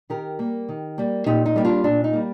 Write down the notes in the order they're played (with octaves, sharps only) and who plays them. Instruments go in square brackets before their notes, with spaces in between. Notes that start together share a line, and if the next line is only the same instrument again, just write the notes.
[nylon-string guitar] D#3 G4 A#4
G3 A#3
D#3
G3 A#3
A#2 D#4 G4
D#4
G3 A#3 G4
D4 F4
A#2 D4
D#4
G3 A#3